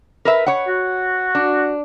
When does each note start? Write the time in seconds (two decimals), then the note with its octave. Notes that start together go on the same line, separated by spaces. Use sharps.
0.25 A#4 B4 E5
0.46 C#5 F#5
0.67 F#4
1.35 D4